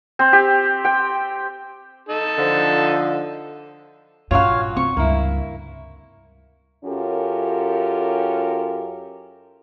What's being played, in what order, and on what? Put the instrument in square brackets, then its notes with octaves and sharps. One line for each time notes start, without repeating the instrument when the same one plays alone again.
[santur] C4
G4
G5
[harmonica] D#4 A4
[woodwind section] D3 F3
[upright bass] A#1 G2 [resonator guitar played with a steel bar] F#3 C#4 F4 [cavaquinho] C#5 F5
[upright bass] C3 [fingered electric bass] C4 [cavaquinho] C#6
[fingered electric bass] C#2 G2 [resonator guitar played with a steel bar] A#3 E4
[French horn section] F#2 C#4 F4 G4 A4 A#4